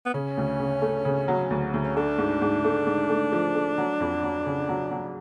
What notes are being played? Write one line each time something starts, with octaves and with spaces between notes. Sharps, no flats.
B3
C#3 C#4
D2
C#3
A3
C#3
F#3
D2
D2
C#4
A3 D4
G#2
G#2
A3
G#2
A3
F3
A3
F#3
F2
F#3
C#3
F#3
F#3